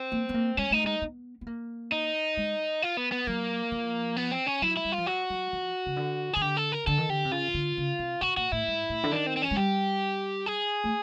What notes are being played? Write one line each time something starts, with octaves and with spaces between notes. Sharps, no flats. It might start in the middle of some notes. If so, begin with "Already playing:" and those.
Already playing: C4
A#3
B3
A#3
G#3 C#4
A3 D#4
G#3 D#4
B3
B3
A#3
D#4
G#3
F4
B3
B3
F#3 A#3
F3
B3
C4
C#4
F#3 E4
E4
G3
F4
F3
F#3 F#4
F#3
F3
C#3
D3
D#3 G#4
D3 G4
A4
A#4
D3 A4
D#3
D3 G4
C3
C#3 F4
D3
C#3
C3
B2 F#4
A#2 F#4
A2 E4
G#2
A2
D3
D#3 D4
C4
C4
C#4
G#3
G3 G4
G#4
A3